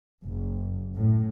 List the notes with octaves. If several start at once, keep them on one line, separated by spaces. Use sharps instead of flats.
F#1
A2